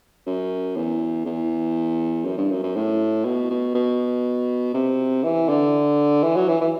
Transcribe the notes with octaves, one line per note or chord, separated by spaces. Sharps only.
F#2
E2
E2
F#2
G2
F#2
F#2
A2
B2
B2
B2
C3
E3
D3
E3
F#3
E3
E3